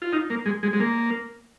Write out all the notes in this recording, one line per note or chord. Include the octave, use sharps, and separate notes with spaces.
F4
D#4
A#3
G#3
G#3
G#3
A#3